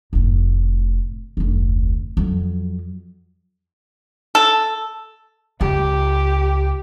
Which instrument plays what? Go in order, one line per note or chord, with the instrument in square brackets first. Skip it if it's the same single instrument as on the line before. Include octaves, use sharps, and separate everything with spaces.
[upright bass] F1 A2
F1 D2
F2 F#3
[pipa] A4
[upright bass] C#2 [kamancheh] G4